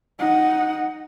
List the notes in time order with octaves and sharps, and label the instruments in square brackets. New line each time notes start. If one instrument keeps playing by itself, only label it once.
[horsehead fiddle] D#4 F#5